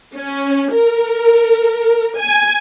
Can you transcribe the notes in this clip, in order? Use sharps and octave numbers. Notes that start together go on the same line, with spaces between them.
C#4
A#4
G#5